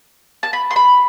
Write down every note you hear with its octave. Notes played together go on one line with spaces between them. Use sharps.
A5
B5
C6
B5